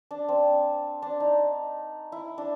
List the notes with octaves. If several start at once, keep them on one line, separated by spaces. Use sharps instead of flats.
D4
C4
D4
D#4
E4
D4